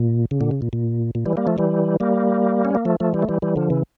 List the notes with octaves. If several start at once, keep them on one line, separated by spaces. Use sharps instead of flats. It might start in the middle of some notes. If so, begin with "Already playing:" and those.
Already playing: A#2
C#3
A#2 D3
C#3
A#2
A#2
A#2
E3 G3
G3 A#3
F3 A3
E3 G3
G3 A#3
C#4
A#3
F3 A3
F3 A3
E3 G3
A3
E3 G3
E3 G3
D3 F3
C#3 E3